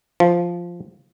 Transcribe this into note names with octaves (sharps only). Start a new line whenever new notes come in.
F3